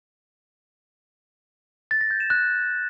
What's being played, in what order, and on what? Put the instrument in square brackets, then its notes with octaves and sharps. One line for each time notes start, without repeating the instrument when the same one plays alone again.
[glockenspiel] A6
A#6
G6
E7
F#6